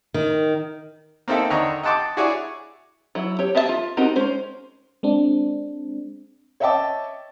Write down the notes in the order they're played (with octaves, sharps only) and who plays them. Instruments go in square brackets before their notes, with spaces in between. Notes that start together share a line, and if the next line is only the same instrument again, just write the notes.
[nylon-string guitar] D#3
[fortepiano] A#3 C4 D#4 A4 E5 G5
D3 D#3 C#5 D#5 A#5
D#5 F#5 G5 A5 C6 D6
E4 F#4 G#4 C#5 D5 G#5
[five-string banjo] F#3 E4
G4 C#5
G4 G#4 E5 F5 A5
F4
C4 D#4 F#4 G4 A#4
G#3 C#4 C5
[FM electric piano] G#3 C4 D4
[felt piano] C#5 D#5 E5 G5 A5 D6